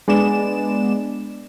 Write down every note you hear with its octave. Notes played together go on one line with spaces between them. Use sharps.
G#3 B3 D4 D5 E7